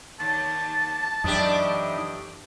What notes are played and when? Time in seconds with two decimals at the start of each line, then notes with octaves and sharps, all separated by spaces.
0.20 D#2 A5
1.24 F#2 A2 E3 D4 D#4 G4